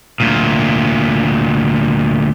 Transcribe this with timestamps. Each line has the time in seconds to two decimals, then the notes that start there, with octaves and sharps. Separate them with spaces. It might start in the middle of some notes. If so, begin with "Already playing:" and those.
0.20 D2 A#2